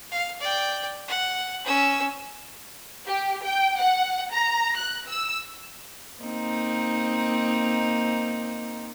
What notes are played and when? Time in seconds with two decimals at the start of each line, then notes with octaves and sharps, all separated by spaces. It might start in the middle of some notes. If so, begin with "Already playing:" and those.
0.11 F5
0.40 D5 G5
1.08 F#5
1.66 C#4 E6
3.06 G4
3.44 G5
3.78 F#5
4.31 A#5
4.77 F#6
5.07 E6
6.21 A#3 C4 D#4